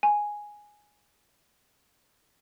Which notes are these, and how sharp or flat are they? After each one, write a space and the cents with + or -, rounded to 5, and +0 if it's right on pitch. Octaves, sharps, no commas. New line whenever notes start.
G#5 +0